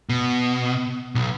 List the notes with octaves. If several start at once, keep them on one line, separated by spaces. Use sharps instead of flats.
B2
B1